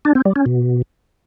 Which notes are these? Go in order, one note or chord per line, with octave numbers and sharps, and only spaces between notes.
D4
C4
G3
C#4
B2